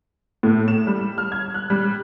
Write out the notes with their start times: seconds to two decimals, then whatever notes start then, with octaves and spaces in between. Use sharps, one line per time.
0.43 A2
0.68 E7
0.87 G3
1.18 F6
1.32 G#6
1.54 F#6
1.70 G3